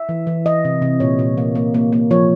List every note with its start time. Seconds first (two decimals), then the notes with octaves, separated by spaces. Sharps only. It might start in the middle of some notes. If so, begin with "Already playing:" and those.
Already playing: E5
0.09 E3
0.27 E3
0.46 E3 D#5
0.65 C3
0.82 C3
1.00 A#2 C#5
1.19 A#2
1.37 A#3
1.55 A#3
1.74 A#3
1.93 A#3
2.11 F3 C#5